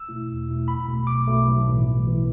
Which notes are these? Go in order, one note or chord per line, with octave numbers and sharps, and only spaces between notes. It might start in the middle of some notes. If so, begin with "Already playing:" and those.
Already playing: E6
B2 A3 E4
E2
B2 A3 E4
B1 B5
B2 A3
B1 D6
B2 A3
B1
A2 E3
B1
A2 E3